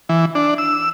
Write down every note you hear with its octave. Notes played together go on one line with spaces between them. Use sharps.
E3
D4
E6